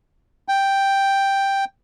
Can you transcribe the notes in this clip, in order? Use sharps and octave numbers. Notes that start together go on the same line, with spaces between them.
G5